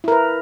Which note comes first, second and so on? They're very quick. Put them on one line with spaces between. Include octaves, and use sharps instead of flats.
E4 A#4 B4